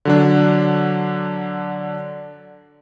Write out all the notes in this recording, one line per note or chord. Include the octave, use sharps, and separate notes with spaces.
D3 F#3 D4